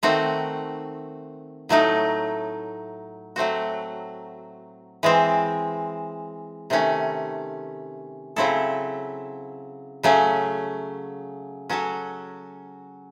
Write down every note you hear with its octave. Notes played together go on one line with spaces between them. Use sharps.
D#3 A3 C4 F#4
A2 F#3 A3 D#4
F#3 A3 C4 F#4
E3 G#3 C4
C3 D#3 A3 C#4
C#3 F#3 C4 E4 A4
C#3 F#3 A3 C#4
F#3 C#4 F#4 A4